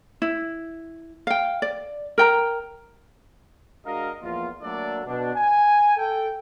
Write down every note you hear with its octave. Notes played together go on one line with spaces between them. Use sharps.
E4
F5 G5
D5
A#4 G5 A#5
G#3 D4 F#4 A#4 D#5 F5
E2 F3 A#3 F4
F#3 A3 A#3 D4 A4 D5
B2 D4
G#5
A4 G5